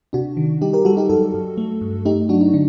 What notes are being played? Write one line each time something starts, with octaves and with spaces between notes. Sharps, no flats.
C3 D4 F#4
D#3
G3 D#4 G4
G4 A#4
G3 F#4 A4
D#4 G4
F#2 F#4 A4
F#2
A3
G2
A3 D#4 G4
F#3 D4 F#4
D#4
D3 D4